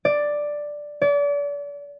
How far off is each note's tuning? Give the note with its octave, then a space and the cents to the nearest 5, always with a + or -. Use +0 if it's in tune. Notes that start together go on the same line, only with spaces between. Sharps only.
D5 +5
D5 -35